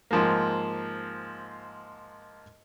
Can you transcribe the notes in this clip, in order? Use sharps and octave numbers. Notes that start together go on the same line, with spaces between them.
G#2 F3 A#3